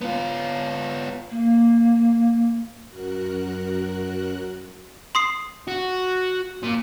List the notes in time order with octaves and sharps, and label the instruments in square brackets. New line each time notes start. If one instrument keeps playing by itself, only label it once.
[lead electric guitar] B3 F4
[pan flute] A#3
[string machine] F#2 F#4 A#4 F#6
[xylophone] C6 D#6 C7
[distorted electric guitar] F#4
A#2